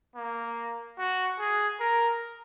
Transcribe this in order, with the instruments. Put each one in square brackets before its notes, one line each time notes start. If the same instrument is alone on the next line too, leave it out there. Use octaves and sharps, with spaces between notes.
[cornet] A#3
F#4
G#4
A#4